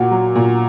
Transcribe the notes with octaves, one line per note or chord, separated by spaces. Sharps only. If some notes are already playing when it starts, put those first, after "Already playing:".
Already playing: A#2 F#4
F#3
A#2